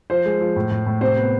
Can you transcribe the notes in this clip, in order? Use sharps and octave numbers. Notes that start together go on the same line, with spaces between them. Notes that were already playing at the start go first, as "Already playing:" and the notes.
F3 C5
G#3
F3
A2
A2
A2
C3 C5
B3